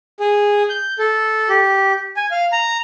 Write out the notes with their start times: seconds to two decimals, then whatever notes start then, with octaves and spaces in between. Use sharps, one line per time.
0.20 G#4
0.70 G6
0.99 A4
1.49 G4
2.17 G#5
2.31 F5
2.52 A#5